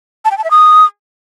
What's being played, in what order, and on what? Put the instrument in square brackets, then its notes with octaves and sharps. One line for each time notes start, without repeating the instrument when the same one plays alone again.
[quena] A5
G5
A5
E5
D#6